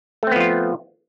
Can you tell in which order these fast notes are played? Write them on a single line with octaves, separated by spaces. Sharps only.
A3 C4 B3 F3 F4